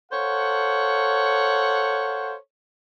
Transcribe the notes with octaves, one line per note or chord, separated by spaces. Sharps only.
A4 C5 C#5 F5 F#5